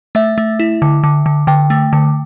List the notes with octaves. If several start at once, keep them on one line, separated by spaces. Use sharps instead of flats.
A3 E5
A3
E4
D3
D3
D3
D3 G5
A3
D3